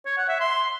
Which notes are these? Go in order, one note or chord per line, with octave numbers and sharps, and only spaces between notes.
C#5
F#5
E5
C6